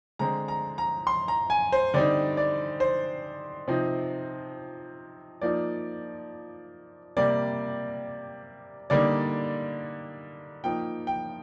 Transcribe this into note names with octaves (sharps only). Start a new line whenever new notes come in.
D3 G#3 C4 A#5
A#5
A#5
C6
A#5
G#5
C5
D3 G3 C4 D#4 D5
D5
C5
C3 F3 C4 D#4
F3 A#3 D#4 D5
C3 G3 A#3 D5
D3 G3 A#3 D#4 D5
F3 A#3 D#4 G5
G5